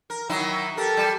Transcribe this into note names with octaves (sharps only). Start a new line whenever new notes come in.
A#4
D#3 F#3 E4
E5
G4 A4 A#4
G3